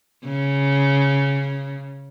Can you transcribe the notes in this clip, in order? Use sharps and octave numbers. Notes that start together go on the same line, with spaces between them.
C#3